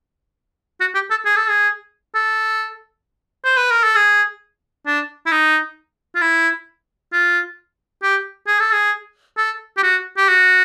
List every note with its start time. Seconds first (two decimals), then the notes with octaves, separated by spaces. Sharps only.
0.80 F#4
0.94 G4
1.11 A4
1.25 G#4
1.36 A4
1.49 G#4
2.15 A4
3.44 C5
3.57 B4
3.71 A#4
3.84 A4
3.96 G#4
4.86 D4
5.26 E4
5.32 D#4
6.15 F4
6.21 E4
7.13 F4
8.02 G4
8.47 G#4
8.60 A4
8.72 G#4
9.37 A4
9.77 G4
9.83 F#4
10.17 G4
10.29 F#4